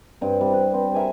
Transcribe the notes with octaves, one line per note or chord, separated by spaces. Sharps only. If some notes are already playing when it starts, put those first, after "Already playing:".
G2 C4
C3 G3
B4
C4
A#4 E5 G#5